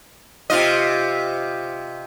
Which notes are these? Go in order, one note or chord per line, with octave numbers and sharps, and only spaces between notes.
C3 F4 D#5